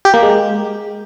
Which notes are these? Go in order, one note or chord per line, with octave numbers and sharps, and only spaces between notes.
G4
A#3
G#3